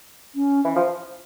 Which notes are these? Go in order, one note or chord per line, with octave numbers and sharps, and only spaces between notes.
C#4
E3
F3